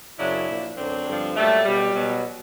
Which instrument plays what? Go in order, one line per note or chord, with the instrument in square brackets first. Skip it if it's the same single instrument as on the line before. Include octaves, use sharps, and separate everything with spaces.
[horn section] F#2 C#3 F#3 D4 E4
A#2 F3
F#2 D3 F#3 C4 D4
G2 D3 F3
A#2 F#3 G3 A3
B2 F#3 G3
B2 F#3